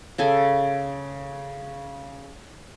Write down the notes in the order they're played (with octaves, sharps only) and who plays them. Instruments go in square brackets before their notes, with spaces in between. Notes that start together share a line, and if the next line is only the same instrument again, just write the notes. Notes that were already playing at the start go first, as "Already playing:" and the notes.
[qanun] C#3 A4 G#5